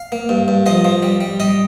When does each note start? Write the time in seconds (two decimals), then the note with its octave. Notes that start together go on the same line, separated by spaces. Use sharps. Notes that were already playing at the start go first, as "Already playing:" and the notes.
Already playing: F5
0.12 A#3
0.29 G2
0.48 G2
0.66 F3 D#5
0.85 F3
1.03 G3
1.21 G3
1.40 G3 D#5